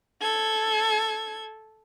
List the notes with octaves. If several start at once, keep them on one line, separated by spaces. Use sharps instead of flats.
A4 G#6